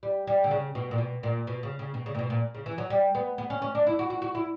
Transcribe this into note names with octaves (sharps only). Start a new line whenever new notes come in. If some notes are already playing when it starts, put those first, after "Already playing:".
G3
G3
D3
C#3
B2
A#2
B2
A#2
B2
C#3
C#3
B2
C#3
A#2
B2
A#2
C#3
E3
F#3
G3
B3
B3
C#4
C#4
D4
E4
F#4
F#4
F#4
E4